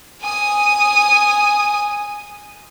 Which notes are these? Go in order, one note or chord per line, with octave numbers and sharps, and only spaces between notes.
G#5 D#6